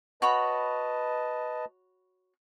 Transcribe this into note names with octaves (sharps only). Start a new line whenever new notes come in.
F#4 B4 C#5 D#5 A5 B5